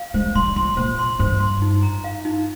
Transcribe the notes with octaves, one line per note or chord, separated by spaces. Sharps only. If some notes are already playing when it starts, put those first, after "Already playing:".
Already playing: F5
G#3 C5
G3 C6
F3 C6
A#2 C5
C6
G2 C5
C6
D#4
A#5
F5
D#4